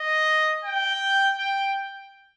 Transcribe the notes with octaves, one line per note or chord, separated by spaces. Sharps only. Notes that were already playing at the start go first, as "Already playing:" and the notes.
Already playing: D#5
G5
G5